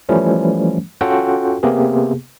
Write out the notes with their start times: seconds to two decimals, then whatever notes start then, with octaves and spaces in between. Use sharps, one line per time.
0.09 E3 F3 G3 A3 C#4
1.01 C#4 F4 F#4 A4 F#5 G5
1.63 C3 A#3 B3 G4 G#4